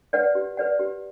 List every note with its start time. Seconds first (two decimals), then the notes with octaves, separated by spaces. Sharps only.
0.13 B4 D5 F#5
0.35 G4
0.57 B4 D5 F#5
0.79 G4